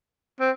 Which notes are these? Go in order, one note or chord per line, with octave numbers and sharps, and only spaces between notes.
C4